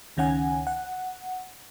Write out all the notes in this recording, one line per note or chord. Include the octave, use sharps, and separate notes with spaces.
C#2 D#3 C#4 F#5 G#5
F#5